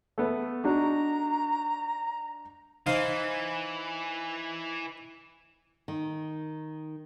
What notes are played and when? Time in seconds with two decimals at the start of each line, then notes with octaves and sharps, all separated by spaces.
0.18 A3 B3
0.64 D4 D#4 F#4 A#5
2.87 E3 D#4 C5 F5
5.88 D#3